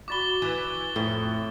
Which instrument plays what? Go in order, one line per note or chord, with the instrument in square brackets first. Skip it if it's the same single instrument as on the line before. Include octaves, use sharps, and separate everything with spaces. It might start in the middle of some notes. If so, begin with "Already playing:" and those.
[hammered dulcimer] F#4 D5 B5 [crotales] D6 A6 G7
[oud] E3 [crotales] D6
[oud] F2 [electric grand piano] A2